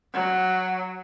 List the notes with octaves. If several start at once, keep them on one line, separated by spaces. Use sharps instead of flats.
F#3